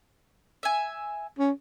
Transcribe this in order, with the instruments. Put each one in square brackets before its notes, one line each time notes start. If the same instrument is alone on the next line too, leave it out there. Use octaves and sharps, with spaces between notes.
[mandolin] E5 G#5
[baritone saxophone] C#4